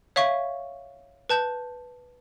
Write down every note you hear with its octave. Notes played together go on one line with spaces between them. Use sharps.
C#5 E5 F5 C#6
B4 A5 G6